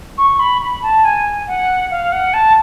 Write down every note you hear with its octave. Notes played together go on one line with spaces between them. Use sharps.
C#6
B5
B5
A5
G#5
F#5
F5
F#5
A5